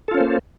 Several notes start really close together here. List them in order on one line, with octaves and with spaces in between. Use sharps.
A4 F4 C#4 C5 A#3